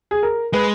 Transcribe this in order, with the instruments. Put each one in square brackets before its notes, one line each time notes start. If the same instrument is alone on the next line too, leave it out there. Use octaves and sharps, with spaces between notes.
[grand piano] G#4
A#4
[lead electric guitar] G#3 [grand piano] B4